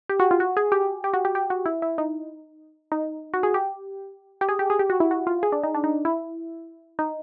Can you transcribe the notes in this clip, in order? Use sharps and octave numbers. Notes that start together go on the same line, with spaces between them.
G4
F#4
F4
F#4
G#4
G4
G4
F#4
G4
G4
F#4
E4
E4
D#4
D#4
F#4
G#4
G4
G4
G#4
G4
G#4
G4
F#4
E4
F#4
F4
G#4
D4
D#4
D4
D#4
E4
D#4